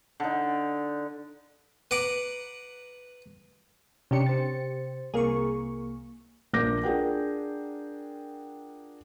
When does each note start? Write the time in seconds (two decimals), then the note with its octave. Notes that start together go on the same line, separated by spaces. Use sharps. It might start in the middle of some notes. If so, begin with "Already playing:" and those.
0.20 D3 D#4
1.91 B4 F#5 A#5 D6
4.11 C3 C#4 D4 G4 C#7
4.26 C5 A6
5.14 C2 A#3 G#4 A#4 C#6
6.53 A#1 A#3 D4 D6 G6 A#6
6.84 D4 F4 G#4 A#4 F#5 G5